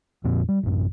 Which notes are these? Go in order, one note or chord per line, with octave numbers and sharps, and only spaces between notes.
F2 A#2 F3 C4
G3
A1 F#2